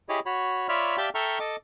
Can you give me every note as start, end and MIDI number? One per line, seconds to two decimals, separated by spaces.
0.09 0.20 64
0.09 0.20 67
0.09 0.20 68
0.09 0.20 73
0.09 0.20 75
0.26 0.68 66
0.26 0.68 73
0.26 0.68 83
0.69 0.97 65
0.69 0.97 73
0.69 0.97 74
0.69 0.97 76
0.69 0.97 83
0.69 0.97 89
0.98 1.09 67
0.98 1.09 74
0.98 1.09 76
0.98 1.09 77
0.98 1.09 79
0.98 1.09 81
1.15 1.39 69
1.15 1.39 76
1.15 1.39 79
1.15 1.39 82
1.15 1.39 85
1.15 1.39 89
1.39 1.56 69
1.39 1.56 75
1.39 1.56 86